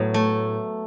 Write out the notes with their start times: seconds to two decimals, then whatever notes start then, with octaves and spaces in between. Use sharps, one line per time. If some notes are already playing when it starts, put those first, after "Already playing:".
Already playing: A2 F#3 B3
0.14 A3